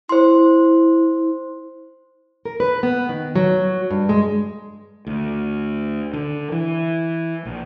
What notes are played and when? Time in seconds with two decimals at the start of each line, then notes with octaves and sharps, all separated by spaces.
0.09 E4 C5 C6
2.45 A#4
2.60 B4
2.83 B3
3.09 D#3
3.36 F#3
3.91 G2
4.09 G#3
5.06 D2
6.13 D3
6.52 E3
7.45 A#1